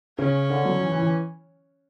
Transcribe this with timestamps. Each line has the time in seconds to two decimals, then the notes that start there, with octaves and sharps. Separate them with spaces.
0.18 C#3 C#4
0.50 D3
0.65 F#3
0.81 E3
0.92 E3
1.02 E3